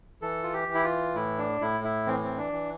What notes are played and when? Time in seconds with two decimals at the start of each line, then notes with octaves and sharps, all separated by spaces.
0.22 E3 A4
0.43 F4
0.53 G4
0.68 E3
0.75 E4
0.84 F4
1.14 A2 E4
1.38 D4
1.61 A2 E4
1.84 E4
2.07 E3 C4
2.24 C4
2.38 D4
2.53 E3